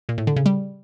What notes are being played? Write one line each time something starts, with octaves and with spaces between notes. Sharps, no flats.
A#2
A2
D3
C#3
G3